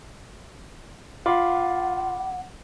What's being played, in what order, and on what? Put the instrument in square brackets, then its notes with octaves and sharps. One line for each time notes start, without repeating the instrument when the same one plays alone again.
[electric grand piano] F4 [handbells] F5 B5 D6 [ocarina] F#5